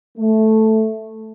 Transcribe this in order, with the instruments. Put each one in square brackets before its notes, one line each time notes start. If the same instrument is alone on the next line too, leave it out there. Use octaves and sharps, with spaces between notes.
[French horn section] A3